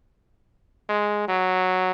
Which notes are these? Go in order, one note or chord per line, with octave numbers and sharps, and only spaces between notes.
G#3
F#3